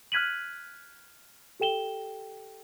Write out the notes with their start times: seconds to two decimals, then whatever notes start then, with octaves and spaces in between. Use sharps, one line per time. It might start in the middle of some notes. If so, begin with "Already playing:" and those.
0.12 F6 F#6 G#6 B6 D#7 F#7
1.60 G4 A4 G5 E7 G7